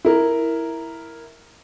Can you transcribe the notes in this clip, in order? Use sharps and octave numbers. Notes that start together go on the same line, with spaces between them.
E4 A#4